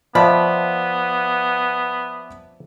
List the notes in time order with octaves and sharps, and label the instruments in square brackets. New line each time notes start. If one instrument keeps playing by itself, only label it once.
[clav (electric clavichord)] F3 [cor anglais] B3 [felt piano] D5 E5 A5 [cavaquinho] B5